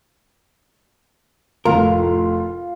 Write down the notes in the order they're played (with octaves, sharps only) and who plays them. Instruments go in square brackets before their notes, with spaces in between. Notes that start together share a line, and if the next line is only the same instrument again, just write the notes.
[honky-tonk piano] F1 A2 [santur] F4 [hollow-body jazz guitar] A#4